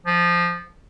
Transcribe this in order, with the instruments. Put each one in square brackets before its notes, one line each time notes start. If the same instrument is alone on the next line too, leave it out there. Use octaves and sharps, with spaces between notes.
[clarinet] F3